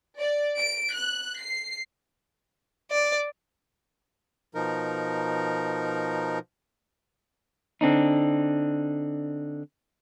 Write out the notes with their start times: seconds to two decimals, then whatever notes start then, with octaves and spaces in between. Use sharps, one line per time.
0.18 D5
0.59 D7
0.94 F#6
1.41 C7
2.91 D5
4.55 B2 F3 D#4 A#4
7.81 D3 C4 D4 D#4